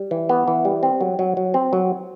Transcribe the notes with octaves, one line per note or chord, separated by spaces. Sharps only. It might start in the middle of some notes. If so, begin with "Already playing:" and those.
Already playing: G3
E3
B3
E3
G3
C4
F#3
F#3
F#3
C4
F#3